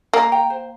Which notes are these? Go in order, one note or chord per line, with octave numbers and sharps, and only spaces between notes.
A#3 F5 G#5
G5 A#5
C5